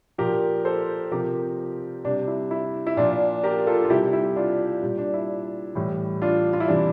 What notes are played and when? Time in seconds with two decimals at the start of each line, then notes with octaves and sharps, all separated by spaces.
0.18 A#2 F3 G4 A#4
0.65 A4 C5
1.11 C3 F3 G4 A#4
2.05 C3 G3 D4
2.27 E4
2.51 E4
2.87 E4
2.97 A#2 F3 D4 F4
3.43 G4 A#4
3.67 F4 A4
3.84 F4
3.90 C3 G3 E4 G4
4.13 E4
4.36 D4 F4
4.83 A#2 G3
4.98 D4
5.14 E4
5.75 A2 E3 G3
6.22 D4 F4
6.53 F4
6.60 E4
6.68 C3 E3 G3 D4